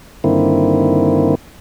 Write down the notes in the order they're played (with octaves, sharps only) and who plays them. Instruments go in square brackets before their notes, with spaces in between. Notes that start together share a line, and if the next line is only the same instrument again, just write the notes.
[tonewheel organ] G2 D3 D#3 A#3 C4 E4